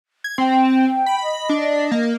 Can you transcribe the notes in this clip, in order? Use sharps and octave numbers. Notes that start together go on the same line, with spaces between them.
G#6
C4 G5
B5
D#5
D4
A#3